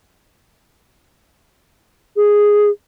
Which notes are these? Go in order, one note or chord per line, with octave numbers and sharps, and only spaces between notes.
G#4